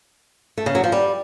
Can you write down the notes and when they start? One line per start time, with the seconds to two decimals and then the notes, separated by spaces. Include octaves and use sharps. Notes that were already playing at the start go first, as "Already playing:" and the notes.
0.58 A3
0.66 C#3
0.75 F#3
0.84 F3
0.92 G3